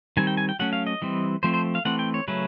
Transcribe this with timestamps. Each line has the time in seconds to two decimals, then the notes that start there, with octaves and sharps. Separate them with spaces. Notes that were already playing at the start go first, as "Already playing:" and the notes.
0.17 D#3 G3 C4 G#5
0.27 G5
0.37 G#5
0.49 G5
0.59 F#3 A3 C#4 F#5
0.73 F5
0.87 D#5
1.02 E3 G3 C4
1.43 F3 A3 C4 C5
1.54 C5
1.75 F5
1.85 E3 A3 C4 F#5
1.99 G5
2.14 C#5
2.28 C#3 F#3 A3 C#4 B4